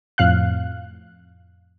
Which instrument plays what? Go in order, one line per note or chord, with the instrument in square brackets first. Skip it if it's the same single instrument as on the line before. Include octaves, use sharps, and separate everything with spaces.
[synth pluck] F2 A2 F5 F#6